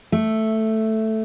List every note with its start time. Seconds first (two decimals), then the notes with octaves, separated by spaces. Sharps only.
0.12 A3